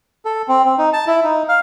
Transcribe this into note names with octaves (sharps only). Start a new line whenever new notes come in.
A4
C4
C4
D#4
A5
E4
D#4
F5